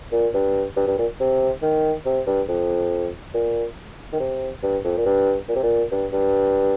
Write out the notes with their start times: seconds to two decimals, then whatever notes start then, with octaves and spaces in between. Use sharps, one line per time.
0.12 A#2
0.34 G2
0.77 G2
0.87 G2
0.98 A#2
1.20 C3
1.62 D#3
2.06 C3
2.27 G2
2.48 F2
3.34 A#2
4.13 D#3
4.20 C3
4.63 G2
4.84 F2
4.97 A#2
5.06 G2
5.49 A#2
5.55 C3
5.63 A#2
5.91 G2
6.12 G2